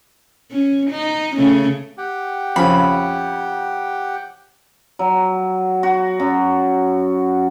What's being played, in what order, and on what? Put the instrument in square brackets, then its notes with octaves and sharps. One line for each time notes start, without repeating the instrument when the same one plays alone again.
[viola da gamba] C#4
D#4
C#3 A3 C#4
[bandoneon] G4 F#5 G5
[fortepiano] F2 C#3 [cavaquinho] B5
[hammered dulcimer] F#3
F#4
F#2